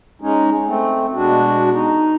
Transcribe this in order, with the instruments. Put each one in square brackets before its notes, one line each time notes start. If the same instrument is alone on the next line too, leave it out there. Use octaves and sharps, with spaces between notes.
[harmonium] G#3 C#4 D#4
A3 C4
B2 G#3 D4 F#4
D#4